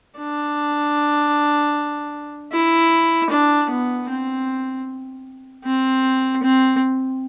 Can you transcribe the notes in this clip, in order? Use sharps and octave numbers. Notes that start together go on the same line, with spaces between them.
D4
E4
D4
B3
C4
C4
C4